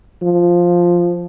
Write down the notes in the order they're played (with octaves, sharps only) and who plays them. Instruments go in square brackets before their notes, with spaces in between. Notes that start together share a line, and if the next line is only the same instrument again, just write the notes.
[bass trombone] F3